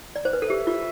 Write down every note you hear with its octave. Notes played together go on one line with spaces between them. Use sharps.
D5
C5
B4
A4
G4 E5
F4